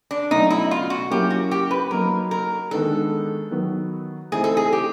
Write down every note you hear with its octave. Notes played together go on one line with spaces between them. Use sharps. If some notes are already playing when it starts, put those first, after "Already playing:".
D4
B2 F#3 A3 C#4 D#4
E4
F4
F#4
F#3 A#3 C#4 E4 G4
F#4
G4
B4
F#3 A#3 D#4 A#4
A#4
D#3 G#3 B3 D4 A4
D#3 F#3 B3
E3 A3 C4 D#4 G#4
A4
G#4
G4